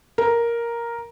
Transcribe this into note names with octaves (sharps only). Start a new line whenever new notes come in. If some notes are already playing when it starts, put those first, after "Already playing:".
A#4